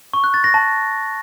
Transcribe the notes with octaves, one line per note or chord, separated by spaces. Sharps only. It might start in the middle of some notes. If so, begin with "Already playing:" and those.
C#6
F#6
A6
A#6
A5